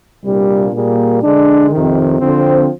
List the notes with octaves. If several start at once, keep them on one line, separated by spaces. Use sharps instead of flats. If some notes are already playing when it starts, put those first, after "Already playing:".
C2 A#2 G3 A#3 D4
A#2 G3 A#3 F4 G#4
D3 G#3 D4
F2 C3 D#3
D3 F3 C4